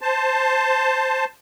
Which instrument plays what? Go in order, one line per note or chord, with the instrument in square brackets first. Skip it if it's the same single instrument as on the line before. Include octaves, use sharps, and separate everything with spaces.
[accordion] C5 A5